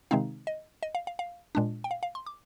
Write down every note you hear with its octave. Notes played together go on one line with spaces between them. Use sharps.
C3 D#3 G#3 C4 D#4 F5
D#5
D#5
F5
F5
F5
A#2 G#3 D4
G5
F5
F5
C6
D6